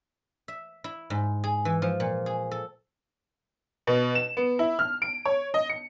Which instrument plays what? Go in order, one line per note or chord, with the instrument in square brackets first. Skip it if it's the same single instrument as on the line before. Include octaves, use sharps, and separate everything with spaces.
[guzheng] E5
E4
G#2
G#4
E3
F3
A#2
G#4
A4
[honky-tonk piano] B2
E7
B3
E4
F6
D7
C#5
D#5
C#7